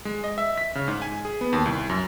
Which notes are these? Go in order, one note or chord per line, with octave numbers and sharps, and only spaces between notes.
G#3
D#5
E5
B6
C#3
G#2
G#5
G#4
B3
D#2
C2
F#2